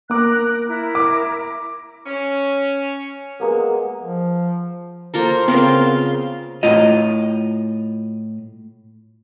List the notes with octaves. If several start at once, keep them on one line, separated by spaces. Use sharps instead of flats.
A#3 A#4 D6 F#6
E4 A#4
D6
C#4
G#3 A#3 B3
F3
A#3 F4 A4 A#4 C5
C#3 B3 C4 F4 A#4 F5
A2 F4 D#5